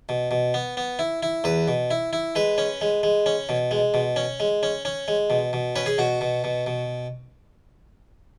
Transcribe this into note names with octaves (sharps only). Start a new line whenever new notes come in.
B2
B2
B3
B3
E4
E4
E2 B4
B2
E4
E4
G#3 B4
C#4
G#3
G#3
C#4
B2
G#3
B2
C#4
G#3
C#4
C#4
G#3
B2
B2
C#4 B4
G#4
B2 F#4
B2
B2
B2